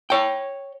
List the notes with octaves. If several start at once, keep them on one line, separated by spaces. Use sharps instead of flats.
C#5 G5